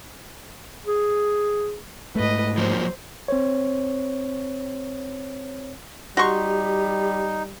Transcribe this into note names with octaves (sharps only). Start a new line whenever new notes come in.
G#4
G#2 A3 B4 D#5
F3 F#3 A#3 C5
C4 C5 C#5
G3 D#4 F#4 G4 C6 C#6